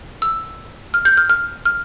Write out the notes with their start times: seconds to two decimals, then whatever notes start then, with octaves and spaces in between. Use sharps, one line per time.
0.22 E6
0.94 F6
1.05 G6
1.17 F6
1.30 F6
1.65 F6